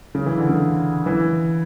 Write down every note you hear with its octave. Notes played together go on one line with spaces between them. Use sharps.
C#3
E3
D3
C#3
E3